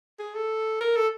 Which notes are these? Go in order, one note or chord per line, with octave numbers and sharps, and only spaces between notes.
G#4
A4
A#4
A4